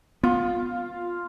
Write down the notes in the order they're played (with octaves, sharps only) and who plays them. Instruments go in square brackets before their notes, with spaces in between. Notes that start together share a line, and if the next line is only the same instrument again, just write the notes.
[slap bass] B3 [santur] F4